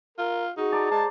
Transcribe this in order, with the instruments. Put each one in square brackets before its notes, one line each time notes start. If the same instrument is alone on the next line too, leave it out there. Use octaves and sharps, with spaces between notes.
[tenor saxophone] F4 [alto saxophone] A#4
[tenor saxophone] D#4 [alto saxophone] F#4 [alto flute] G#4
[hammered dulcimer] D5 A5 A#5
[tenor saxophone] G#3 [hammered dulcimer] C5 [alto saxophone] A5